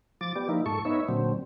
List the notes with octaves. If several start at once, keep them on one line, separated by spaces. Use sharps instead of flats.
F3 D6 A6
B3 G4 D5
F3 A#3 D#4 E4
G#2 A4 C#6
B3 D#4 C#5 E5
A#2 D3 F#3 C4